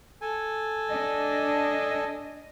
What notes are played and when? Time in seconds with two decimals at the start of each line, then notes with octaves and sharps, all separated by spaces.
0.21 A4 G#5
0.89 D4 D#5